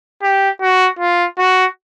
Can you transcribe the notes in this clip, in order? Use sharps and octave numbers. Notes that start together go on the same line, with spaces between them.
G4
F#4
F4
F#4